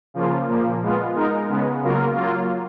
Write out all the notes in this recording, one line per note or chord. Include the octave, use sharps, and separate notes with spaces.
C#3 F3 A#3 F4
A#2 F3 A#3
G#3 B3 F4
G#3 D#4 A#4
C#3 G#3 B3
C#3 F#3 A#3 F4 A#4
F#3 A#3 F4